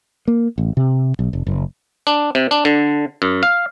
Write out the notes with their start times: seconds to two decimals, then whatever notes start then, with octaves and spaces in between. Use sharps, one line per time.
0.28 A#3
0.58 A1
0.77 C3
1.19 B1
1.33 F1
1.47 F#1
2.07 D4
2.35 C3
2.51 D4
2.65 D3
3.22 F#2
3.43 F5